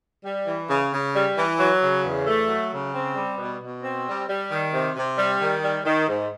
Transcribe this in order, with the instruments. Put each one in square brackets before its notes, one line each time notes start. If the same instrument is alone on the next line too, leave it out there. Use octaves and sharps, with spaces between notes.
[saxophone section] G3
E3
C#3
C#3
G3
E3
F#3
C#3
E2
A3
F#3
C#3
C4
G3
B2
B2
C4
G3
G3
D#3
C3
C3
G3
D#3
G3
D#3
G#2